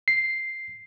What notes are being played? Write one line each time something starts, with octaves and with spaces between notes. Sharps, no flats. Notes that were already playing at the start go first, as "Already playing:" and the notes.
C7